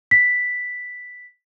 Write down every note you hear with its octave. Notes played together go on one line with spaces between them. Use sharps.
B6